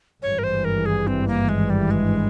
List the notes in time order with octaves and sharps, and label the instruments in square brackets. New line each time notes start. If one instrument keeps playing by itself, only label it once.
[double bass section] G#1 G2 E3 [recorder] C#5
[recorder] A#4
C5
A#4
G#4
C4
A#3
G#3
G3
G#3